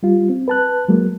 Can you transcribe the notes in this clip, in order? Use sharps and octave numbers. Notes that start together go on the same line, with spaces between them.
G3 F4
C4
B4 A5 F#6
F#3 G#3 A#3